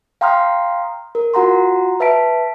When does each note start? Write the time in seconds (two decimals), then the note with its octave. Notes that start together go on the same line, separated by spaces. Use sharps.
0.21 F5 G5 A#5 C6 D#6 F6
1.15 A#4
1.34 F4 F#4 F#5 A#5 C6
2.00 B4 E5 A5 B6 D7